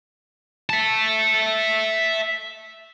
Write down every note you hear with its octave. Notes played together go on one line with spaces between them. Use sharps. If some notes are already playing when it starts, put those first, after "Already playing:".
E5 A5